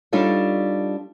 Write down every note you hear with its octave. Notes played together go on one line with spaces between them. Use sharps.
G3 D4 D#4 F4 A4 C#5